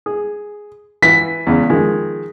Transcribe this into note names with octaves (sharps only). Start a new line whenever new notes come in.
G#4
E3 B6
E2 C#3 G#3
D#3 F3 G#3